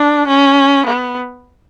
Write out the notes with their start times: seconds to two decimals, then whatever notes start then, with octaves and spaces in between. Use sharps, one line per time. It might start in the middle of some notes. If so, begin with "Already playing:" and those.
Already playing: D4
0.27 C#4
0.86 B3